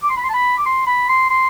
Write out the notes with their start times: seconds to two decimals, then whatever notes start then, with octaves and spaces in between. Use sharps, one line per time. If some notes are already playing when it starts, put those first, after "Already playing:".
0.02 D6
0.09 C6
0.17 B5
0.24 C6
0.29 A5
0.34 B5
0.57 D6
0.66 C6
0.87 B5
1.09 C6
1.30 C6